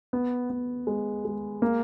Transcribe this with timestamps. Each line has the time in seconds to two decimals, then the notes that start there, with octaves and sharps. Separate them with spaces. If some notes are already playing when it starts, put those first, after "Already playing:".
0.13 B3
0.50 B3
0.87 G#3
1.25 G#3
1.62 A#3